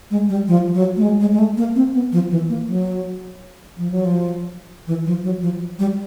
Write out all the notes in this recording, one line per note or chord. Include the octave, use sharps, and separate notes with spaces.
G#3
G3
F3
F#3
A3
G#3
G#3
G#3
A3
A#3
C4
B3
F3
E3
A#3
F#3
F3
F#3
F3
E3
F3
F#3
F3
G3